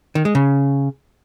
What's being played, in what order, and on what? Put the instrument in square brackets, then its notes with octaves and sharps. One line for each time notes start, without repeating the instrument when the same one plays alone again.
[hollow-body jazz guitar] D#3
G#3
C#3